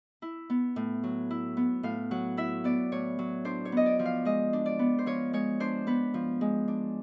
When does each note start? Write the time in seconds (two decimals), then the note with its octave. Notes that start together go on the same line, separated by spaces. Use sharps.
0.22 E4
0.50 B3
0.76 A2
1.03 F#3
1.31 E4
1.57 B3
1.83 A2 F5
2.11 F#3 F#5
2.37 E4 E5
2.64 B3 D5
2.92 A2 C#5
3.19 F#3
3.45 D4 C5
3.65 C#5
3.72 B3 D#5
3.86 D5
3.99 F3
4.05 F5
4.25 G#3 D#5
4.53 D4
4.66 D5
4.79 B3
4.99 C5
5.06 F3 C#5
5.33 G#3 C#5
5.60 D4 C5
5.87 B3 B4
6.14 F3
6.41 G#3
6.68 D4